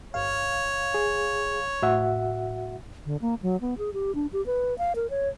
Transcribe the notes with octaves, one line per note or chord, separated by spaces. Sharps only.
G1 C#5 F5
G#4
A2 F#4 E5 F#5
D3
A#3
F#3
B3
G#4
G4
D4
G4
B4
F5
A#4
C#5